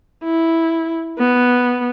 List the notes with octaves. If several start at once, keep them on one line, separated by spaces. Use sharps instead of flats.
E4
B3